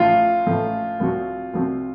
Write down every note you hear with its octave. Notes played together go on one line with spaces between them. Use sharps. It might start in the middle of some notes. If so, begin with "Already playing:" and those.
Already playing: A1 A2 F3 A3 F4
A1 A2 F3 A3
C2 C3 F3 C4 F#4
C2 C3 F3 C4 F#4